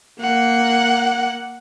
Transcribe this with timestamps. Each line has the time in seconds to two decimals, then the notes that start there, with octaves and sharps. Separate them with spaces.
0.20 A#3 F#5